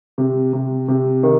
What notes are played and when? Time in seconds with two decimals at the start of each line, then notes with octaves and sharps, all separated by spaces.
0.18 C3
0.53 C3
0.88 C3
1.23 D#3